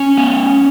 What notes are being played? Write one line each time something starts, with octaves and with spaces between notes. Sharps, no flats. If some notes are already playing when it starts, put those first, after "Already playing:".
Already playing: C#4
B3